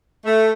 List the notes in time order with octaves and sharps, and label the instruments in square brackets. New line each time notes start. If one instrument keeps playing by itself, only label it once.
[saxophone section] A3